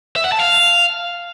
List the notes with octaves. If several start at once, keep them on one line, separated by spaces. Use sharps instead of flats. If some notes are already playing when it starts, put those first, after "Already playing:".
E5
F#5
A5
F5